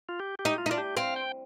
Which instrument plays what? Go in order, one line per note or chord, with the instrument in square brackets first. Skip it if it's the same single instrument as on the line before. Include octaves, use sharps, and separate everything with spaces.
[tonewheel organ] F4
G4
G4
[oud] D#4
[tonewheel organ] F4
[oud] D#4
[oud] D4 [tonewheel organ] F4
[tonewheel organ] G4
[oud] C4 [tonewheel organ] F5
[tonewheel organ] G5